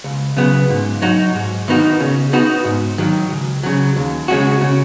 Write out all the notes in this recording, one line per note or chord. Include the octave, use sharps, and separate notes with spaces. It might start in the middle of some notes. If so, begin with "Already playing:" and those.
C#2
C#3 F#3 B3
G#2
F#3 D#4 F#4
G#2
D#3 B3 D#4 F#4
C#3
B3 D#4 F#4
G#2
D#3 F#3
C#2
C#3 F#3
D#2
C#3 G#3 C#4 F#4
C#3